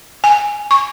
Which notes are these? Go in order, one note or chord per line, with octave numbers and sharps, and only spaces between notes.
G#5
C#6